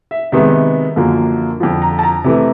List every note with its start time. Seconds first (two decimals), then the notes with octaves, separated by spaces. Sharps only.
0.11 E5
0.32 C3 D#3 G#3 B3 E5
0.96 F#2 D3 F3 A#3
1.60 F2 D3 F3
1.82 A#5
1.99 A5
2.03 A#5
2.24 C3 E3 A3